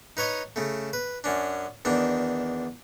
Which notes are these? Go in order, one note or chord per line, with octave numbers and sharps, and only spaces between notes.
D#4 B4 C#5 D#5
C#3 A3
B4
F#2 C#4 D4
E2 D#3 D4